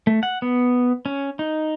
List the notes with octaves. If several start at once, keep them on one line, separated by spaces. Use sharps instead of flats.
A3
F#5
B3
C#4
D#4